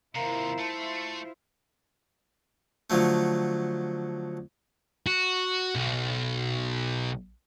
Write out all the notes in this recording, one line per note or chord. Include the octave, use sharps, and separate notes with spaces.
D#2 C3 E4 F4 A#4 C5 F5 A#5
A3 A5
D3 F3 F#3 A3
F#4
B1